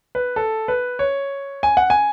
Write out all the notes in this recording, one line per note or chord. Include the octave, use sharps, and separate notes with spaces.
B4
A4
B4
C#5
G#5
F#5
G#5